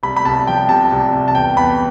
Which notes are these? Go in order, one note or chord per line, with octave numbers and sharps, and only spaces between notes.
C2 B5
B5
C2 A5
F3 G5
C3 A5
C2
C2
A5
E2 G5
E2 B5